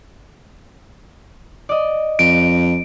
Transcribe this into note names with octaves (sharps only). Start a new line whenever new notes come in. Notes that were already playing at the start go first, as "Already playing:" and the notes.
D5 D#5
F2 D7